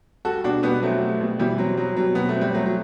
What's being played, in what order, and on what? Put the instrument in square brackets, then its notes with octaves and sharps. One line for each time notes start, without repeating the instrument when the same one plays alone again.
[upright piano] G3 [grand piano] F#4 A4
[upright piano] B2 [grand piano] D4 F#4
[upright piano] B2 [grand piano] G3 B3
[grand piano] F#3 A3 [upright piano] C4
[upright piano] G3
B2
[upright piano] B2 [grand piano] E3 G3
[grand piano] F#3 [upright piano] C4
[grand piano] F#3 [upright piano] G3
[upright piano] B2 [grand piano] F#3
[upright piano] B2 [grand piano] B3
[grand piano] A3
[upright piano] C4
[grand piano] G3
[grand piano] F#3 [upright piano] A3
[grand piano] F#3